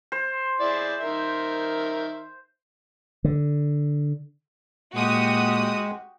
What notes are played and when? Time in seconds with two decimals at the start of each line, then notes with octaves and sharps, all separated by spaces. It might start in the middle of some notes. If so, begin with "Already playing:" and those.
0.12 C5
0.60 E4 G#4 D5
1.01 D#3 A#4 E5
3.24 D3
4.95 A#2 G#3 F#4 G4 D#6